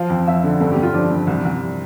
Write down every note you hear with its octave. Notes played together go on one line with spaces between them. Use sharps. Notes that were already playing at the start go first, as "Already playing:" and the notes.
Already playing: F3 F5
F2
F2 E5
D3
G2 A4
G4
G2
F4
F3 D4
G2
C2
C2